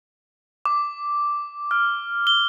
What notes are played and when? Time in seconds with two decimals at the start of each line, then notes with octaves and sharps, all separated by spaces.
0.66 D6
1.71 F6
2.27 G7